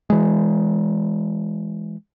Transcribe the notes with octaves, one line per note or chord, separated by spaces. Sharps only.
E3 G#3